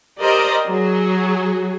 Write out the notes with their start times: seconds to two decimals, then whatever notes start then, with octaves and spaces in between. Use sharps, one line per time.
0.20 G4 A#4 C5 D5 D#5
0.69 F#3 G#4